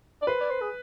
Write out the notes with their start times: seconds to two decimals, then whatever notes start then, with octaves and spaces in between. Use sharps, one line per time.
0.22 D5
0.27 B4 C5
0.41 D5
0.51 C5
0.61 G#4